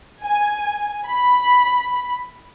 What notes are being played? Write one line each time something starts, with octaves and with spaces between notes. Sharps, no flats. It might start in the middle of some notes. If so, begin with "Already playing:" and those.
G#5
B5